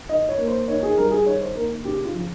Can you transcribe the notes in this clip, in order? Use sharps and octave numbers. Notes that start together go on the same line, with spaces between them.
D#3 D#5
C#5
A#3
C5
D#3 C#5
G#4
G3 A#4
G#4
D#3 C#5
C5
A#3 A#4
C#3 G4
F4
F3